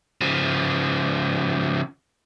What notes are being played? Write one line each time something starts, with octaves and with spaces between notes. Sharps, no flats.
C#3 F3